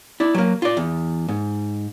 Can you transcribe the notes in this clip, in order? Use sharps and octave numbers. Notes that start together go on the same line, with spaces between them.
E4 D5
F#3 A#3
F4 D5
E2
G#2